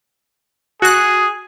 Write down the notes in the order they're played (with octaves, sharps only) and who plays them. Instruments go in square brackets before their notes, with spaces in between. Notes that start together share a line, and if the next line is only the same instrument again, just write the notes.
[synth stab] F#4 F#6 [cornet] G#4